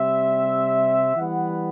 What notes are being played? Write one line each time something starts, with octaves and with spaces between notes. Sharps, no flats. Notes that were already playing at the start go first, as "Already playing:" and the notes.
Already playing: C3 G3 C4 E5
E3 G3 B3 F#5